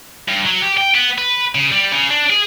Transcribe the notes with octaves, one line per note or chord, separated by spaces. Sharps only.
G2
F#3
G4
G5
B3
B4
C#3
G3
C#3
D4
G#4